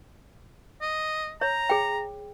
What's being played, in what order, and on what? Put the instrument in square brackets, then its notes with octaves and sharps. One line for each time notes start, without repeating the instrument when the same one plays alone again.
[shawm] D#5
[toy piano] C#5 [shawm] A#5
[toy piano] G#4 G5